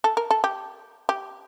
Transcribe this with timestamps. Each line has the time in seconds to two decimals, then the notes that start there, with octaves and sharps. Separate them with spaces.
0.04 A4
0.17 A#4
0.30 A4
0.44 G4
1.09 G4